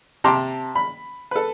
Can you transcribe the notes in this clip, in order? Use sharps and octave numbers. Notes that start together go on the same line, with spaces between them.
C3 A5 A#5 C6 D6
B5
A4 B4